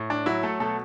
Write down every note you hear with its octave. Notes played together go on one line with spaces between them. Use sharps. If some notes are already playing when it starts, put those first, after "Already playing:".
Already playing: A2
D4
F#3 E4
A3 A4
B2 A3 A4